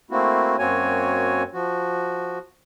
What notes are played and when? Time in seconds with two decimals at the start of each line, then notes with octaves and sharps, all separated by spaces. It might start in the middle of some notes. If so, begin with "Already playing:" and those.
0.11 A3 A#3 C4 E4 F#4
0.59 F#2 A#3 C4 F#4 C#5 G#5
1.53 F3 F#4